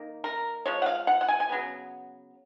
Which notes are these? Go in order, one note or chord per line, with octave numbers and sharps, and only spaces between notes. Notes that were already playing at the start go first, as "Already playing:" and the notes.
Already playing: D#3 A#3
A#4
F3 G#3 C#5
F#5
F5
F#5
F#5
G#5
G#5
C#3 F#3 B3